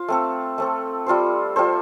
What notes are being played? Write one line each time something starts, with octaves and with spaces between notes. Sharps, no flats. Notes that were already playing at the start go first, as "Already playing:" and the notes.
Already playing: F4 C5 F5
A3 C4 A4
A3 C4 A4
G3 F4 A4 C5
G3 F4 A4 C5